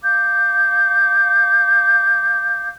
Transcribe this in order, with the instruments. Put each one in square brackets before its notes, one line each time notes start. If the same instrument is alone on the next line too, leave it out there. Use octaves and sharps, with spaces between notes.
[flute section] F5 D6 G6